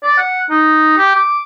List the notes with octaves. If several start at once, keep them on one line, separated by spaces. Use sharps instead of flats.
D5
F#5
D#4
G4
D6